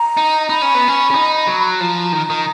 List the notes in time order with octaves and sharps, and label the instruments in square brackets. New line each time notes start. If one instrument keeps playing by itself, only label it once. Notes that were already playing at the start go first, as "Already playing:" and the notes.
Already playing: [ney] A#5
[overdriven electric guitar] D#4
[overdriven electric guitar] D#4 [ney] B5
[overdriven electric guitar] C#4
B3
C#4
C#4
D#4
F#3
[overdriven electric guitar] F3 [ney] A#5
[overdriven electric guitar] D#3
D#3